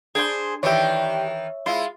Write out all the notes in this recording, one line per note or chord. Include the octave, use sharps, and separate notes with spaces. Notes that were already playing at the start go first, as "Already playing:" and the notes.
D4 G#4 B4 C5
D#3 E3 D4 G4 C#5 E5
G#3 E4 F4